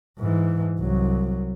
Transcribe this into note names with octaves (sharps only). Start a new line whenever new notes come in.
G#2 E3
C2 F#3